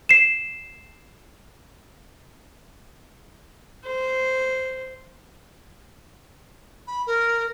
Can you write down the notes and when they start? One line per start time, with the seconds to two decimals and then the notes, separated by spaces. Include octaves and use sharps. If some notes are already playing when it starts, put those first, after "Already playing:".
0.09 C7 E7
3.86 C5
6.87 B5
7.06 A#4